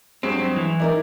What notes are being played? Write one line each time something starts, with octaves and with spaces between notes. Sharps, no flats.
G2 F#3 G#3 C4
E3
D#4 E4 A#4 D5